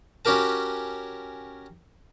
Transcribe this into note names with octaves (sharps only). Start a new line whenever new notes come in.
C#4 F#4 G4 A#4 A5